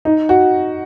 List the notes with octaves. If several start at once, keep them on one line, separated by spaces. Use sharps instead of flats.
D#4
F#4